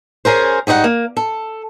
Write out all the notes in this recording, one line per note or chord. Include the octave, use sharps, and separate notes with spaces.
C#4 G#4 A#4 C5
G#2 G3 D#4 C5 F#5
A#3
A4